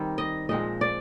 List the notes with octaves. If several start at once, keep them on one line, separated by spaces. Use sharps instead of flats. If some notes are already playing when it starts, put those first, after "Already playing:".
Already playing: D#3 G3 C4
D#5
A#2 F3 G#3 C4 D#5
D5